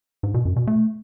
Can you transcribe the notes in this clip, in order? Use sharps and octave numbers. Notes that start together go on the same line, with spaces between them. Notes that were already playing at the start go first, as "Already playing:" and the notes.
G#2
B2
F#2
B2
A3